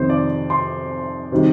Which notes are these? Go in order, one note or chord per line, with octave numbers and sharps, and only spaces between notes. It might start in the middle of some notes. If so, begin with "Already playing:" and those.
Already playing: F2 C3 D#3 C5
D5
C6
C3 D#3 G3